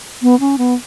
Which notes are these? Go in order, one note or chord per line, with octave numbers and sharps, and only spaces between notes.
B3
C#4
B3